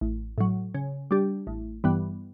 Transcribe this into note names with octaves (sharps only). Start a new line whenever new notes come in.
A1
A2 F#3
C#3
G3 D4 G4
A1
G2 E3 G3 B3